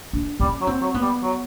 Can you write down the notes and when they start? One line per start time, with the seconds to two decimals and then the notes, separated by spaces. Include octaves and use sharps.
0.13 D4
0.40 G3 C#4
0.61 F#3
0.67 C4
0.81 F#3
0.94 B3
1.01 G3
1.22 F#3